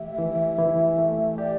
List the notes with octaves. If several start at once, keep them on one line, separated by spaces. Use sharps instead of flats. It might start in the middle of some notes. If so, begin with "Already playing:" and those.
Already playing: E3 A3 G4 E5
E3
E3
A3
G4 D5